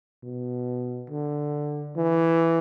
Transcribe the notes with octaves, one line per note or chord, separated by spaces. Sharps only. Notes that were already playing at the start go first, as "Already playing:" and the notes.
B2
D3
E3